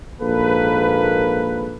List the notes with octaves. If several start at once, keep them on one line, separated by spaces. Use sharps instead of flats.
A#1 G#2 A#3 A4 B4